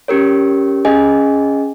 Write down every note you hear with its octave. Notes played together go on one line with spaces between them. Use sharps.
C#4 G4 A#4 C#5
C#4 G#4 D#5 G#5